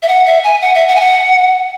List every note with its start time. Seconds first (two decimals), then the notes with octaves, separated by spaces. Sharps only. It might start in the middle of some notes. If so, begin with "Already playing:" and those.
0.02 E5
0.08 F#5
0.26 E5
0.43 G#5
0.61 F#5
0.74 E5
0.88 F#5
0.95 G#5
1.00 F#5